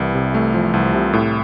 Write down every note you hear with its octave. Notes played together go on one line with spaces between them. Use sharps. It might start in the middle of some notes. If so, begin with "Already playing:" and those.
Already playing: C2 E3
C3
A3
F3
C2
C3
A2